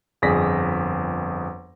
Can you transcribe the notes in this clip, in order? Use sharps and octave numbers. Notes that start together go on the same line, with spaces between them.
G1 F2 G#4 D5 A#6 B6